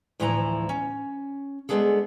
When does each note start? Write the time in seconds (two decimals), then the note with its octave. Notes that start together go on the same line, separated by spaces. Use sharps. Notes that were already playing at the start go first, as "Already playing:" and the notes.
0.20 D2 A2 E3 F3 E4 A#5
0.69 C#4
1.69 G#3 A3 B3 D4 G#4 A4